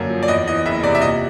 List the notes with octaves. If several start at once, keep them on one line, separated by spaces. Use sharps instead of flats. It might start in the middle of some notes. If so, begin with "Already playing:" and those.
Already playing: F#2 D3 A#3
F3
D5
E2 D#5
E3 D#5
F#1 E5
C3 D5
E5
A#2 D#5